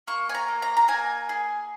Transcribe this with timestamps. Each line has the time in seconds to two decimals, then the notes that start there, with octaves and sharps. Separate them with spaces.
0.07 A#3 C#6
0.29 G#5
0.35 A#5
0.48 A#3
0.62 A#5
0.77 A#5
0.88 A#3 G#5
1.29 G#4